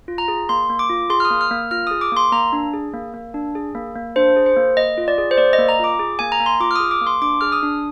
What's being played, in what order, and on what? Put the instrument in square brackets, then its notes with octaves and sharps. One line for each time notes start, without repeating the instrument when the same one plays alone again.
[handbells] F4
A#5
G#4
A#3 C6
A#3
D6
F4
G#4 C6
F6
D#6
A#3
F6
A#3
F4 F6
D#6
G#4
D6
A#3 C6
A#3 A#5
D4
G#4
A#3
A#3
D4
G#4
A#3
A#3
D4 C5
G#4
C5
A#3
A#3 D#5
F4
D5
G#4
C5
A#3 D5
D#5
A#3
A#5
F4 D6
G#4
A#3 G#5
A#5
A#3
C6
F4 D6
F6
D#6
G#4
D6
A#3
C6
D4 D6
G#4 F6
D#6
D4